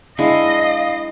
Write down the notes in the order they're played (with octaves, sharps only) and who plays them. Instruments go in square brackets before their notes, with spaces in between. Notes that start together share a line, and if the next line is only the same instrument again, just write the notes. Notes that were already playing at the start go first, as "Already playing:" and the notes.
[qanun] G#3 D4 E4 [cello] D#5 [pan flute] F5